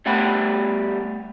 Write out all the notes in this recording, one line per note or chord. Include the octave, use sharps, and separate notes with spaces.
G3 A3 B3 F#5 G5 B5